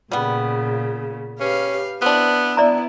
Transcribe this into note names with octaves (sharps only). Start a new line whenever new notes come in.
A#2 C#3 G3 B3
C#4 G4 B4 F5
B3 C4 D4 E4 E6
B3 E4 D5 E5 A#5